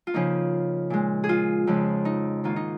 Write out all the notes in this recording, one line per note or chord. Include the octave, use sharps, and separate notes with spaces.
F4
C#3 F3 A#3 D#4
A#2 G#3
G#4
F4
F2 C#3 F3 G#3
D#4
G#2 D#3 A#3 F4
D#4